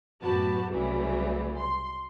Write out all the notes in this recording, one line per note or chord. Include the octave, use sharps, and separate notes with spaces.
F#2 A2 B3 F#4 G4 A5
C2 C#3 E3 F#3 G3 A3
C6